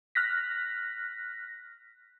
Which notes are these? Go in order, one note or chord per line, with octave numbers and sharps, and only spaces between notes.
F6 F#6 A#6 B6